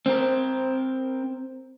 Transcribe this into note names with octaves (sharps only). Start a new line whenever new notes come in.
C4 A#4